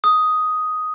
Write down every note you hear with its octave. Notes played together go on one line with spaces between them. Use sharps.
D#6